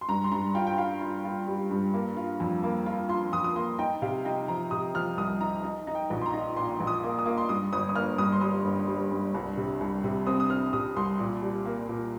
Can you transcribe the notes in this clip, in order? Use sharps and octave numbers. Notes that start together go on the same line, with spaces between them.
C6
G2 A#5
C6
G2 A#5
F4 G5
G5
F4 F5
F4
F4
G3
G2
A#3
F4
F2
A#3
F4
F4 C6
F2 D#6
D#6
A#3 C6
D#4 G5
C3 F5
D#4 G5
F3 A#5
C3 D#6
F3 F6
C2 D#6
D#4 A#5
D#4
D#4
G5
A#1
C6
A#5
D#4
A#2 C6
A#1
D#6
A#3
D#6
A#3
C6
G2 D#6
G1 D#6
D#6
A#3 F6
G2 D#6
C6
G3 D#6
G1
G3
G2
C2
C3
C2
C3
C4 D#6
D#6
C4 F6
C3 D#6
C2 C6
A#2
G3
A#3
A#2